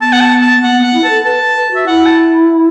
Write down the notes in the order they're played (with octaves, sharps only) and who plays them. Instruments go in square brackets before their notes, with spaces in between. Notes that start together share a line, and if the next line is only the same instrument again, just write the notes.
[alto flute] B3 [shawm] A5
[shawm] F#5
A5
A5
[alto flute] B3 [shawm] F#5
[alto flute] B3 [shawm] F#5
[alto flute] E4
[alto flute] B4 [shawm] A5
[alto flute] A4
[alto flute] B4 [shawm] A5
[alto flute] B4
[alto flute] F#4 [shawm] E5
[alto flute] E4 [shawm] F#5
[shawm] A5